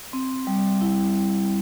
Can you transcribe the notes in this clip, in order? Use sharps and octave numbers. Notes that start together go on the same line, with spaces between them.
C4
G3
E4